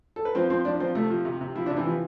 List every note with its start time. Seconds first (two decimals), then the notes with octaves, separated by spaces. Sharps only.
0.16 A4
0.25 B4
0.35 F3 C4 C5
0.50 F3 C4 C5
0.65 F3 D4 D5
0.80 F3 C4 C5
0.95 C3 A3 A4
1.10 F3
1.25 C3
1.41 C3
1.55 F3 E4
1.66 C3 D4
1.77 E3 E4
1.86 F3